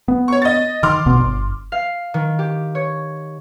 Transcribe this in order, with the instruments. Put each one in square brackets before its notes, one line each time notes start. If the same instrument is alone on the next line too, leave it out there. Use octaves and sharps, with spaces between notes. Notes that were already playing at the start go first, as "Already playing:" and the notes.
[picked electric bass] B3
[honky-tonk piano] C#5 C#6
D#5 A6
[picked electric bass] D#3 [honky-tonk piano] C6 D6 F6
[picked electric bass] A#1 B2 B3
G1
[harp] F5
D#3
G4
C#5